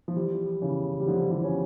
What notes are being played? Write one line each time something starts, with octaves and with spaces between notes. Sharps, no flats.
F3
E3 G3
C#3 E3
G3
D3 F3
E3 G3
C#4